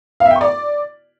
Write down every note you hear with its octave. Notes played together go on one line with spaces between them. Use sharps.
F5
E5
G5
C#6
D5